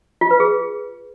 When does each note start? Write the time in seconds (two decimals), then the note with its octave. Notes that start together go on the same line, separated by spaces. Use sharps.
0.21 F4
0.31 B4
0.40 G#4